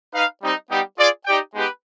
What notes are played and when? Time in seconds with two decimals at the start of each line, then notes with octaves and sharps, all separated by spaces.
0.14 D#4 B4 F5
0.42 G3 C4 D#4
0.70 G3 B3 D#4 G4
0.98 F4 G#4 D5
1.26 D#4 G4 D5 G5
1.54 G#3 B3 D#4 G4 B4